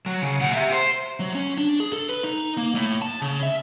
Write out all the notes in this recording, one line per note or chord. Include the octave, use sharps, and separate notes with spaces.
F#3
C#3
A#2 F#5
G4 E5
C5
F#3
C#4
D4
G#4
A4
B4
D#4
A#3
A2
A5
C#3
E5